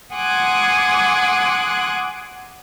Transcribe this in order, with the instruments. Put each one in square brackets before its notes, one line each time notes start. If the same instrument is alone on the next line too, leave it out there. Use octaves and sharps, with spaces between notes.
[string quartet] F#5 G#5 C6 D6 D#6 F#6